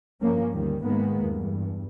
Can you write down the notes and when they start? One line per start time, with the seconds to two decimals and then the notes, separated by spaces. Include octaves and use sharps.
0.21 G2 F3 A#3 C#4
0.53 D2 D#3 G3
0.84 G#2 D#3 G#3 A#3 B3
1.23 E2 G2